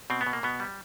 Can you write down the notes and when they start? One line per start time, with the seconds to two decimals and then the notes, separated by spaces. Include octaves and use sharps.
0.10 B2 C4
0.21 B3
0.27 B2
0.33 A#3
0.43 B2 B3
0.60 G3